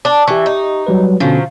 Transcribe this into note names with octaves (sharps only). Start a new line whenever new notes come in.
D4
E3 G4 C#6
D#4
F#3 G3 B4
B2 D3 F3 F#3 C#4